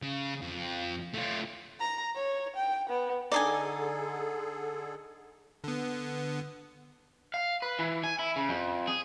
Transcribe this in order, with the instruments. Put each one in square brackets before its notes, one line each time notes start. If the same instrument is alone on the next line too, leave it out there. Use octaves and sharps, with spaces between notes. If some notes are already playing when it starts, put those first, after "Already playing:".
[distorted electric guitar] C#3
F2
A3 F4
[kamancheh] A#5
C#5
G5
B3
[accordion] D3 G#4 A4 [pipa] D4 D5 [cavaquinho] D#4 D#5 G#5
[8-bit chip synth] D3 B3
[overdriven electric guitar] F5
B4
E3
G#5
E4
C#3
F2
G#4